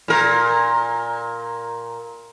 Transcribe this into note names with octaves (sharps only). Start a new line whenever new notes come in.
A#2 A#4